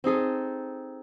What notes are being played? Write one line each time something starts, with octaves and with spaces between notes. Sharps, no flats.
C4 D#4 G#4 A4